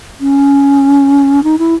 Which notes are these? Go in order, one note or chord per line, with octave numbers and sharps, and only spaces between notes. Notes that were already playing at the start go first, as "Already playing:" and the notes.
C#4
D#4
E4